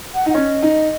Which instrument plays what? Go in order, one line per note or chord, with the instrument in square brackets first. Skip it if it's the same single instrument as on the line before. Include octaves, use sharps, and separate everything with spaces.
[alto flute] F#5
[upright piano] D#4
[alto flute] F#5
[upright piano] C#4 [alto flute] D#5
[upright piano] D#4